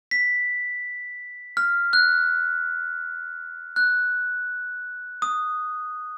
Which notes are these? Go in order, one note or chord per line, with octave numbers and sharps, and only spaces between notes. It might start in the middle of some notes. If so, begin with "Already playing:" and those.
B6
F6
F#6
F#6
D#6